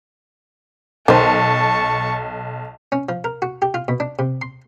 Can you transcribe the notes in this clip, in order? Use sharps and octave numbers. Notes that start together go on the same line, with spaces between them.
B1 D#3 C5 A5 C#6
C#4
F3
A#4
F#4
G4
F4
B2
D4
C3
C6